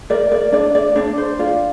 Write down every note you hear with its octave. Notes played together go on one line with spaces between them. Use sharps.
A#4 D5
D5
D4 D5
D5
D4 D5
C5
F4 D5